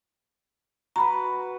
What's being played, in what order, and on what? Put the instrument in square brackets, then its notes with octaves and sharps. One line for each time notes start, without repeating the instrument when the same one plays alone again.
[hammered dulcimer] F#4 B4 [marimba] A#5 B5